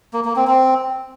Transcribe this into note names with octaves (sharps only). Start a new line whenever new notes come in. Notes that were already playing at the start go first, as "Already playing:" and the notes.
A#3
A#3
C4
C4